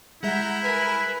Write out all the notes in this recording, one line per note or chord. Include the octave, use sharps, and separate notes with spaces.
G3 G#3 E4 E5 F#5 A#5 G6
A#4 B4 G#5